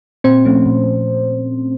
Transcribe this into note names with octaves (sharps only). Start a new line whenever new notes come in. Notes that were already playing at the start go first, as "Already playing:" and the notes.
A#2 C4 C5
F3 A3 C#4
A#2